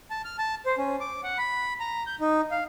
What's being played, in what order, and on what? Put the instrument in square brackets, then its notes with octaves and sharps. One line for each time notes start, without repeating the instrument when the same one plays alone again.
[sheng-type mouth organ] A5
F6
A5
C5
C#4
D6
F#5
B5
A#5
G6
D#4
F5